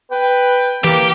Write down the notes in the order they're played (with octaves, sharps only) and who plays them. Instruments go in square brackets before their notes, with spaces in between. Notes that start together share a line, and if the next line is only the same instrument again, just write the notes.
[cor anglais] B4 [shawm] G5
[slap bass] E3 [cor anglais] A#3 [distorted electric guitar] G4